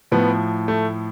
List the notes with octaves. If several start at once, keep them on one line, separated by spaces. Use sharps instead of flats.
A2 F3 B3
A3